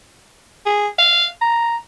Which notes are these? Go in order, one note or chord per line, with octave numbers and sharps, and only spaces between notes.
G#4
F5
A#5